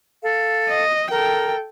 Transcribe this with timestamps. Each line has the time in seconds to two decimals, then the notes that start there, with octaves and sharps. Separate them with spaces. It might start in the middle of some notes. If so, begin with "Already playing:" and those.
0.23 A4 F5
0.69 D#5
1.10 A4 A#4 G5